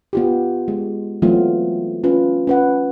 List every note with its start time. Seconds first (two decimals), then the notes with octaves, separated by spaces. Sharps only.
0.13 B3 F4 G4
0.68 G#3
1.22 E3 F#3 A3 B3 C4 F4
2.04 C#4 F4 B4
2.47 C#4 B4 F#5